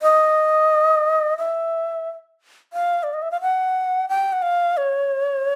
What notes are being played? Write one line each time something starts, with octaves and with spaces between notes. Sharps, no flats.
D#5
E5
F5
D5
D#5
E5
F5
F#5
G5
F#5
F5
C#5